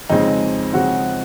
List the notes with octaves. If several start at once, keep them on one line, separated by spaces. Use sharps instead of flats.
F2 C#3 G#3 C4 D#4
F2 C#3 G#3 C4 F#4